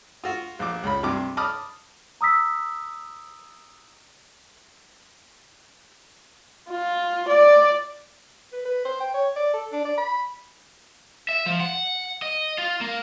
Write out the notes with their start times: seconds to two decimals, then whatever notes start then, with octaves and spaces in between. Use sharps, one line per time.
0.24 F4 F#4
0.59 A#1 D6
0.83 C#2 B5
1.03 G2 C3 D6
1.37 A5 B5 D6 D#6 F6
2.21 A#5 D#6 E6 B6
6.71 F4
7.29 D5
8.53 B4
8.65 B4
8.85 C5
9.00 G5
9.14 C#5
9.36 D5
9.54 A4
9.72 D4
9.85 D5
9.97 B5
11.29 E5
11.46 F3
11.60 F#5
12.22 D#5
12.58 F4
12.81 A#3